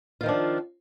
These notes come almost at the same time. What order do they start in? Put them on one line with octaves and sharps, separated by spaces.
F4 D#3 F3 D4